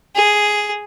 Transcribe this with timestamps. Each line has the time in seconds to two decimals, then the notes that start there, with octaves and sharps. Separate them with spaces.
0.15 G#4